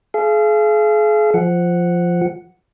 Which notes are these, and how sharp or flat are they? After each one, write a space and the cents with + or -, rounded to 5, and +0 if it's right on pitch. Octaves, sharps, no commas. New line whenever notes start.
G#4 +40 F5 -35
F3 +0 F#5 +0